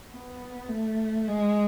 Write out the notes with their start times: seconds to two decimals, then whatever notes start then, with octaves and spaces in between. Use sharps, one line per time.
0.10 B3
0.69 A3
1.27 G#3